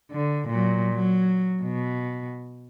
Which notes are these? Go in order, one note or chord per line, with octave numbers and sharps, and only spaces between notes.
D3
A#2 F#3
F#3
B2